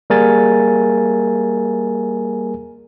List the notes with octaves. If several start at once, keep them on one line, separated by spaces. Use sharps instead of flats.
G3 A#3 G#4 A#4 G#5 A6